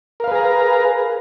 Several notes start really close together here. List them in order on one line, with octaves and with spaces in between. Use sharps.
A#4 F5 B4 G#4 A#5